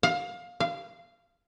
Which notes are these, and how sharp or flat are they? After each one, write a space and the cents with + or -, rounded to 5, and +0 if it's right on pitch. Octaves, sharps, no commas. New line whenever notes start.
F5 +20
F5 -15